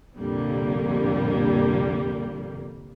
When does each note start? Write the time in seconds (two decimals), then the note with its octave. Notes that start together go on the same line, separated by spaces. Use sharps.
0.17 C2 F2 A#2 D3 G3 A#3